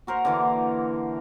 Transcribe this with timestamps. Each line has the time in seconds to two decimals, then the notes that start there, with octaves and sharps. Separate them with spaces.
0.07 F#4 A#4 C5 F#5
0.25 D3 E3 A#3